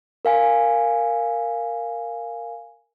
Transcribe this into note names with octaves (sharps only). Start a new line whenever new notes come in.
A#4 F5 G#5